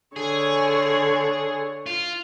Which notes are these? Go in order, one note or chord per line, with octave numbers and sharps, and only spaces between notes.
D3 G#4 C#5
F4